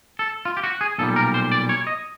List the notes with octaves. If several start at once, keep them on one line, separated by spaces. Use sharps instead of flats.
A4
F4
G4
F#4
G#4
B1 A#2 G3 A4
A#4
C5
D5
C#5
D#5